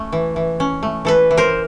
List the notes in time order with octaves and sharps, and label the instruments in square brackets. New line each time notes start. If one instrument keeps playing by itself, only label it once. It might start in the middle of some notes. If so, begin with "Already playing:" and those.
Already playing: [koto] A3 C#4
E3
E3
C#4
A3
E3 A4 B4
E3
A#4 C5